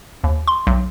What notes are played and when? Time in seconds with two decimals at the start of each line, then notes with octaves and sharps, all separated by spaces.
0.24 D#2
0.48 C6
0.67 B1